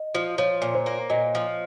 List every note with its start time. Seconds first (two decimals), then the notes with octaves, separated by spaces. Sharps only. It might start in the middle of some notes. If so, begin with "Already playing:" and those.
Already playing: D#5
0.15 F3
0.38 F3 C#5
0.62 A#2
0.75 C5
0.86 A#3
1.10 A#2 D#5
1.35 F3